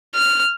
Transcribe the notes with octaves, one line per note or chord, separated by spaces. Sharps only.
F6